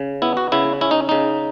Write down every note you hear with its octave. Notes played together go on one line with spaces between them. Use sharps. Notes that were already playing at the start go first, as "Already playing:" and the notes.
Already playing: C#3
B3 E4
F#4
C#3 E4
C#4 E4
D#4
C#3 D#4